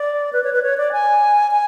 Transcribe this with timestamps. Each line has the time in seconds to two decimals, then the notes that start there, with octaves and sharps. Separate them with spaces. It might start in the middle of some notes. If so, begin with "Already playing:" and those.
Already playing: D5
0.33 B4
0.44 C#5
0.53 B4
0.63 C#5
0.78 D5
0.92 G#5
1.51 G#5